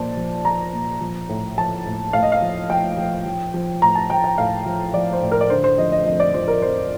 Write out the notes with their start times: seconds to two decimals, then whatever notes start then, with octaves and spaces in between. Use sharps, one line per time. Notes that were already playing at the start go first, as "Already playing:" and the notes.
Already playing: A#2 F3 C5 D5 A5
0.17 F3
0.45 F3 A#5
0.73 A#2
1.01 F3
1.29 A2
1.57 F3 A5
1.85 A2
2.13 A2 F5
2.23 D#5
2.32 F5
2.42 F3
2.70 F3 G5
2.97 F3
3.26 F3
3.54 F3
3.82 A2 A#5
3.95 A5
4.10 F3 G5
4.24 G5
4.38 A2 F5
4.66 F3
4.93 F3 D5
5.13 C5
5.22 A2
5.32 A#4
5.41 D5
5.50 D3 C5
5.64 C5
5.78 F3 D#5
5.92 D#5
6.06 F2 D#5
6.20 D5
6.34 F3 C5
6.48 A#4
6.62 F2 C5